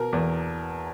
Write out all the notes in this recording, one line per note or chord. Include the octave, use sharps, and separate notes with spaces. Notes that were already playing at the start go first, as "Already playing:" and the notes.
Already playing: B2 A#4
E2